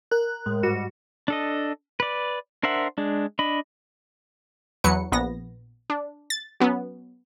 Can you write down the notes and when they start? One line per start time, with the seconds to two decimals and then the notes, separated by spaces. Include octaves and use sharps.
0.11 A#4 F#6
0.46 A2 G#3
0.62 G#2 G3 F#4
1.28 D4 A4 D#5
2.00 B4 D5
2.63 D4 A#4 C5 E5 F#5
2.98 G#3 D4
3.39 D4 D#5 B5
4.84 E2 F#3 B4 C#7
5.12 A#1 B3 A#6
5.90 D4
6.30 A6
6.60 F#3 B3 C#4